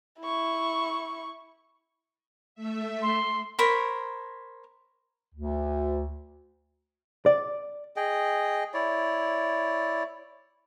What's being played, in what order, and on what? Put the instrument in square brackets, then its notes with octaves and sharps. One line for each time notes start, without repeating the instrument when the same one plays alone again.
[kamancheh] E4 C#6
[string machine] A3 E5
[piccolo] C6
[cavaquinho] A#4 C5 C#5 B5
[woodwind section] D2
[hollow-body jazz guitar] D5
[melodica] G#4 D#5 G5
E4 C#5 D5